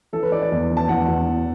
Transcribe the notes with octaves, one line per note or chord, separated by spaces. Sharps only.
E3 A4
B4
E3 D5
D5
E2
E3
A5
E2 F#5
E2
E3